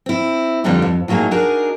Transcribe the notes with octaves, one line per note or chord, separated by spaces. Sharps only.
C4 E4
F2 D3 G3 D4 D#4 G4
F2
A2 F#3 A#3 D#4 G#4
D4 D#4 F#4 G#4 A#4